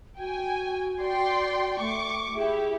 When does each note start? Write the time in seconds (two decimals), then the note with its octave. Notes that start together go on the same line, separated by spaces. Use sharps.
0.19 F#4 G5 G#5
1.01 D5 G5 C6
1.79 A3 C#6 D6
2.35 E4 G4 G#4